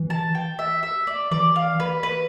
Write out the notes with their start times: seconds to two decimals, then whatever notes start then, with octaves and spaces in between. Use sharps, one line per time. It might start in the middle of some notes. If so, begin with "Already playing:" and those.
Already playing: E3
0.10 A5
0.35 G5
0.59 E5
0.83 E5
1.07 D5
1.31 E3 D5
1.56 F5
1.80 B4
2.03 B4